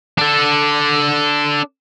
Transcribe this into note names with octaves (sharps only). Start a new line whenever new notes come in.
D4 A4